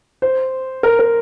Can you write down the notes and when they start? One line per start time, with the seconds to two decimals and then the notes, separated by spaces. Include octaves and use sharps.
0.22 C5
0.83 A#4
0.99 A#4